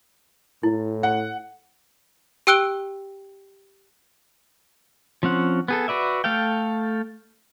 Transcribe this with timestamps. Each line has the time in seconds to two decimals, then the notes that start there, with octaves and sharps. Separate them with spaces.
0.63 A2 E4
1.03 F#5
2.47 G4 G5 E6 F#6 D7 G7
5.23 F3 C4 C#4 F#5
5.68 B3 G#4 A4
5.88 F#4 B4 D5 E5
6.24 A3 A4 F5 G5